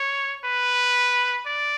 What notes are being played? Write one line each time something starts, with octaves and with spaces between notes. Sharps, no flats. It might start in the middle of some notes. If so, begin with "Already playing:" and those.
Already playing: C#5
B4
D5